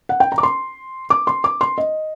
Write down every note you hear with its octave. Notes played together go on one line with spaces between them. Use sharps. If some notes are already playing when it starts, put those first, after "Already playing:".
F#5
G5
A#5
D6
C6
D6
C6
D6
C6
D#5